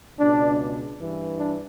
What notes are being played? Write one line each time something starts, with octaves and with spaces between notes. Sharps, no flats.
C#2 B2 D4
G2 E3
D4